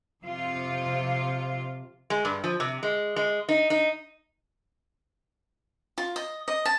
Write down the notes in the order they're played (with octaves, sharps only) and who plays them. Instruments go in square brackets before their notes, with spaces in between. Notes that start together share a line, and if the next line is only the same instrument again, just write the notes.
[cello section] F2 C3 F4
[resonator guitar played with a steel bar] G#3
G2
F3
C3
G#3
G#3
D#4
D#4
[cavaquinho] F4
D#5
D#5
A5